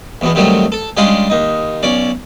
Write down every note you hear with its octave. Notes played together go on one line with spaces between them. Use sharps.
E2 B2 B3
C3 D#3 F#3 G3 A3
A4
G3 G#3 C#4 D4 F4
D#2 D#4
B1 C#4 D5